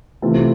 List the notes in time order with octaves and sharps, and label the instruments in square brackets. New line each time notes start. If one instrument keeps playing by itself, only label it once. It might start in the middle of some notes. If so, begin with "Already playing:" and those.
[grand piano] C3 E3 A3 C4 F4